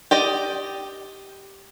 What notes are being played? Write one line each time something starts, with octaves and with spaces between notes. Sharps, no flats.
G4 D5 D#5